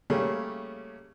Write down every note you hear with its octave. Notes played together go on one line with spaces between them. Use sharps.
C#3 G3 A3 A#3 C#4